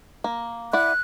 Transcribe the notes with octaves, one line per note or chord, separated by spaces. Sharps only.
A#3
E4 D5 F#5 F#6